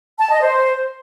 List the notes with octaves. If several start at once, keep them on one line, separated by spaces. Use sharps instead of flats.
A5
D#5
C5